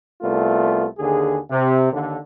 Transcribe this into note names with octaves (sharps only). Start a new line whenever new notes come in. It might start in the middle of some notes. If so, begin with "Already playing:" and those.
C2 A3 B3 F4
D#2 D3 G#4
C3
D#2 D3